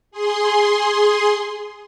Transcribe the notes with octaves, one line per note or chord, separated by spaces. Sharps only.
G#4 C6